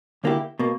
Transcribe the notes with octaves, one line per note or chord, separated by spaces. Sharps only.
D2 D3 A#3 E4 G4
B2 A#3